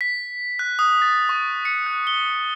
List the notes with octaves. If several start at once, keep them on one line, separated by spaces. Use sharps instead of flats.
B6
F#6
D#6
A6
C#6
C#7
F#6
G7